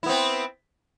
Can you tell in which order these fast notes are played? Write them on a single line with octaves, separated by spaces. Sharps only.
E4 B3 C4